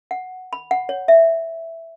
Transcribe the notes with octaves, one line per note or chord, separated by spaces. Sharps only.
F#5
B5
F#5
C#5
E5